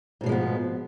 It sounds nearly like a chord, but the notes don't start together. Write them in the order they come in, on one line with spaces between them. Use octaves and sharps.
G#2 B2 F3 G#3 B3